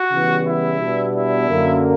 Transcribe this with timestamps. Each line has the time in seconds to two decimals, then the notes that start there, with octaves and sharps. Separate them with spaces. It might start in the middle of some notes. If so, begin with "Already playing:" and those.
Already playing: F#4
0.11 C#3 E3 G3 B3
0.46 E4
0.80 B2 G3 B3 D4
1.14 E4
1.49 F#2 D3 A#3